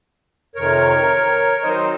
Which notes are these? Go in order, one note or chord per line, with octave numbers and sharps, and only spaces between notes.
F2 C3 D#3 A#4 C#5
D#3 F#3 C4 D#4 C5 D#5